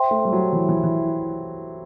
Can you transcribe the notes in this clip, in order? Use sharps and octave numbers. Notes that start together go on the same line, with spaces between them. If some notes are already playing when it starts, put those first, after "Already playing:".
Already playing: C5 E5 G5 C6
A3
G3
F#3
E3
E3
E3